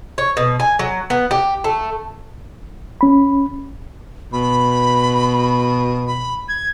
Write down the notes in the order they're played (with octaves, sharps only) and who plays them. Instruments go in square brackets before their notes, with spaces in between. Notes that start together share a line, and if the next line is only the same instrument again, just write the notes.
[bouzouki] C#5
B2
G#5
F#3
B3
G4
A3
[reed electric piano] C#4 B5
[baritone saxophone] B2 [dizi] B5
[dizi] B5
G#6